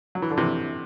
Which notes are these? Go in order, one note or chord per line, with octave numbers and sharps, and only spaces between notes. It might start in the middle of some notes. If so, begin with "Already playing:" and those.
F#3
E3
D3
C3 E3